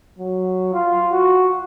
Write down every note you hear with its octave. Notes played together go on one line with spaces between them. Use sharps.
F#3
F4
F#4